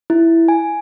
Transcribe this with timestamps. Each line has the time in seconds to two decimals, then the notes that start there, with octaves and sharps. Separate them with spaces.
0.10 E4
0.48 G#5